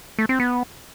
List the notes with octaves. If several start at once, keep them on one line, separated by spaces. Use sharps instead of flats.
A3
C4
B3